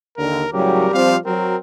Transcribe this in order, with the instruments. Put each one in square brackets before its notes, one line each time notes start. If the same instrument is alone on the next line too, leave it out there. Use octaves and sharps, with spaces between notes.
[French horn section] D#2 D3 [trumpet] A#4
[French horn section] A2 C#3 F#3 [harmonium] G3 G4 [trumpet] A#4
[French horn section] F3 C4 [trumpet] F5
[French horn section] F#3 [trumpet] C4 [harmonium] A#4